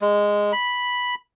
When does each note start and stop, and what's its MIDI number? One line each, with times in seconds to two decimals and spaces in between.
0.01 0.52 56
0.52 1.15 83